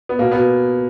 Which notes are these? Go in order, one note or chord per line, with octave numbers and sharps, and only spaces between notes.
B3
B2 A#3
B2 B3